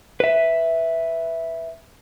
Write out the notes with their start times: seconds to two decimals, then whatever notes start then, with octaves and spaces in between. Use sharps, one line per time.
0.20 B4 E5